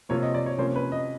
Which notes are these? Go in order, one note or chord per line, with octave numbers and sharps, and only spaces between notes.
C3 F3 A#3 C#5
D#5
D5
C#5
C3 F3 A#3 C#4 C5
B4
D#5